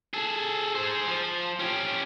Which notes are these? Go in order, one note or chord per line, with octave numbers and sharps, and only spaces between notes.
G#4 A4
G#4 C5
F3
C#4 G4